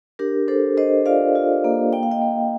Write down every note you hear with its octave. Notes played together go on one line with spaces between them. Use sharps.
D4 G4 A#4
D4 A4 C5
D4 C5 D#5
F4 D5 F5
F4
A#3
A#3 G5
F5
D#5 G5
A#3